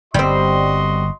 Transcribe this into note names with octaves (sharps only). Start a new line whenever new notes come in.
G1 G3 C4 F#4 D#5 C6